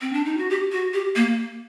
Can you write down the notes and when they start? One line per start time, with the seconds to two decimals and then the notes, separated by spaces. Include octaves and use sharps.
0.01 C4
0.13 D4
0.25 D#4
0.37 F#4
0.50 G4
0.72 F#4
0.94 G4
1.16 A#3